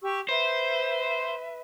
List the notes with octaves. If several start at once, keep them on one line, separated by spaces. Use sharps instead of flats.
G4 C#6 E6
B4 C5 E5